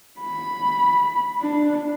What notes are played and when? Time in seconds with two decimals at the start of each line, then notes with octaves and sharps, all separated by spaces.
0.20 B5
1.42 D4